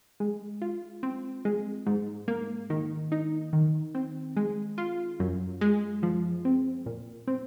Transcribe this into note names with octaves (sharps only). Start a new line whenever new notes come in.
G#3
F4
C4
G#3
G#2
A#3
D#3
D#4
D#3
C4
G#3
F4
F#2
G#3
F3
C4
A#2
C4